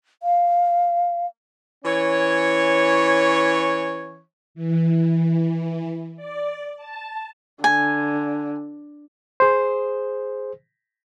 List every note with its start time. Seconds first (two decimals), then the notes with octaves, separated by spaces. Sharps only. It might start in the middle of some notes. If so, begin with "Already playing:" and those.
0.23 F5
1.85 E3 C#4 C#5
4.55 E3
6.16 D5
6.77 A5
7.64 D3 G#5
9.40 G#4 C5